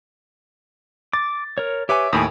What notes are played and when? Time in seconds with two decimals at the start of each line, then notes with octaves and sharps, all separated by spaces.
1.13 D6 A6
1.58 A#4 C#5
1.89 G4 B4 C#5 E5 G#5 D6
2.13 D#2 A2 G5 G#5 B5 D#6